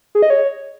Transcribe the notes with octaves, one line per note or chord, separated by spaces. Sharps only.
G#4
D#5
C#5